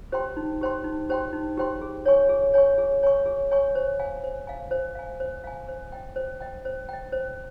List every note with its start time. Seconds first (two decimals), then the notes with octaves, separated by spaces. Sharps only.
0.12 G4 C5 G5 C6
0.37 D#4
0.61 G4 C5 G5 C6
0.84 D#4
1.10 G4 C5 G5 C6
1.33 D#4
1.57 G4 C5 G5 C6
1.81 G#4
2.06 C#5 G#5 C#6
2.29 G#4
2.54 C#5 G#5 C#6
2.78 G#4
3.03 C#5 G#5 C#6
3.26 G#4
3.51 C#5 G#5 C#6
3.75 C5
3.99 F5 G#5
4.24 C5
4.47 F5 G#5
4.71 C5
4.95 F5 G#5
5.20 C5
5.44 F5 G#5
5.68 C5
5.92 D#5 G5
6.16 C5
6.41 D#5 G5
6.65 C5
6.89 D#5 G5
7.12 C5